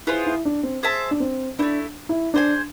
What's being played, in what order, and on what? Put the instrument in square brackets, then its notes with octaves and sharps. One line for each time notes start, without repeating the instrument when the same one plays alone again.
[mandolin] B3 F4 G#4 C5 [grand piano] E4
[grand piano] E4
D4
C4
[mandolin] G#4 C5 E5 A5
[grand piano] D4
C4
[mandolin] C4 E4 [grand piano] D4
[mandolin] A3
[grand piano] E4
[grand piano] D4 [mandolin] G#4 C5 G#5